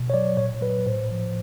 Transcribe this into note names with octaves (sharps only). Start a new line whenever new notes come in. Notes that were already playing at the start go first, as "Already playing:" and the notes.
Already playing: B2
C#5
F#3 D5
A#2 C#5
F#3 B4
A2 C5
F3